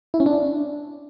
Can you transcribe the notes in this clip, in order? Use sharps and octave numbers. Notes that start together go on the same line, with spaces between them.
E4
C#4
D4